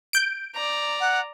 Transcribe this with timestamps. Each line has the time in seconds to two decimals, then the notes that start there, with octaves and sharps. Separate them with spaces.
0.13 G6 D7
0.54 D5 A#5
1.00 F#5